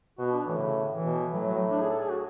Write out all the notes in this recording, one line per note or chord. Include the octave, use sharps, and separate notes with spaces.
B2 F#4
D4
A2 E3
D3
C#3
E3
B2
A2 F#3
F#3
D4
G#4
A4
G#4
F#4